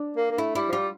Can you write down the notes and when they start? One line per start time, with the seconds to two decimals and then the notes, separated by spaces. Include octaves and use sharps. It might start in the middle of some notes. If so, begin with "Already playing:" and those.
Already playing: D4
0.17 A#3
0.31 A#3
0.38 A3 E4
0.55 G3 E4
0.69 F3
0.72 G3 F4